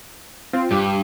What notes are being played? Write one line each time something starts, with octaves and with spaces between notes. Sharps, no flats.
C4 F4
G2 D4 G4